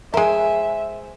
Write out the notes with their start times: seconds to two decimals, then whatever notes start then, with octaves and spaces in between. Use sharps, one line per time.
0.14 G#3 A#4 C5 E5 G#5